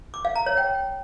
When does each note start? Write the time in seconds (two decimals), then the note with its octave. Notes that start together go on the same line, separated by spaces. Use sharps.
0.14 D6
0.25 F5
0.36 A#5
0.46 C#5
0.57 G5